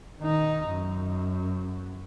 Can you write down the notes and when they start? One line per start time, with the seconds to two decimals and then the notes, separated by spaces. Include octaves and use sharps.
0.20 D#3 D#4
0.70 F#2